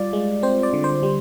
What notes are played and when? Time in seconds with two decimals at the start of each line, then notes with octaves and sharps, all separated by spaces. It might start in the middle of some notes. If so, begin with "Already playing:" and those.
Already playing: G3 F4 D5
0.13 G#3
0.43 C4 C5
0.63 D5
0.73 D3
0.84 C5
1.03 G3